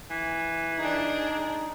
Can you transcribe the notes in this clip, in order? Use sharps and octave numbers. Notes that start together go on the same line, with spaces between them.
E3
D4 D#4 G#4